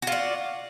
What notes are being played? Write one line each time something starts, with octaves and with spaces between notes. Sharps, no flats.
F4 F#4 D5